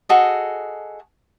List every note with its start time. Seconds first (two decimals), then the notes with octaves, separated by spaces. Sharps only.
0.09 F#4 G#4 A4 D#5